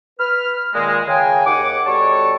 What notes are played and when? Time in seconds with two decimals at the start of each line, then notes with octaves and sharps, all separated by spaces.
0.19 B4 F6
0.74 A#2 D#3 G#3
1.08 C#3 G5 G#5
1.45 D#2 F#5 D6
1.86 B2 G3 A4 C#5 A5 C#6